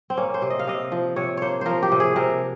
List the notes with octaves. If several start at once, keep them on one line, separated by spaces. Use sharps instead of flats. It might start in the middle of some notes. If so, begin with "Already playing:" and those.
C4
A#3 C#4
C5
C3
D#5
F5
C3 D#5
F3
C3 C#5
A#3 C5 C#5
F3 A#4 C5
G4
C3
G#4
C3 A#4